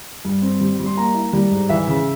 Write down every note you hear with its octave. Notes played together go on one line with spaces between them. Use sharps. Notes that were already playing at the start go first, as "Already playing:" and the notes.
G2
C4
G3
G3
C6
A#3 A#5
E4
G3
G#2
E3 E5
C#3